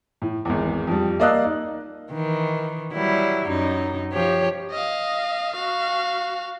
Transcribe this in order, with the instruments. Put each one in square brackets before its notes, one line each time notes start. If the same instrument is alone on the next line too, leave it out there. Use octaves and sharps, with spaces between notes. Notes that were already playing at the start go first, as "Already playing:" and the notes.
[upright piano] A2
G#1 E2
F2 G3
A#3 D5 D#5 F5 E6 F#6
D#4
[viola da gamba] D#3 E3
F#3 G3 E4
F#2 D#4
F3 G4 C#5
[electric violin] D#5 F5
F#4 F5